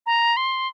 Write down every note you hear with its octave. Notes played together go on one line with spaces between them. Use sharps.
A#5
C6